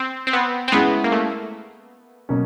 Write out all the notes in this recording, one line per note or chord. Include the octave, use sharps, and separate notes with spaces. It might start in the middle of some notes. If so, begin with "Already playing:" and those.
Already playing: C4
C4
B3
C4
G#3 B3 C#4 E4 G#4
A#3
A3
B2 F#3 A#3 C#4